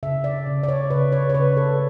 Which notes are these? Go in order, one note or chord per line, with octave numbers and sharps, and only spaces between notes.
C#3 E5
D5
C#3
D5
C#5
C#3 B4
C#5
C#5
C#3 B4
A4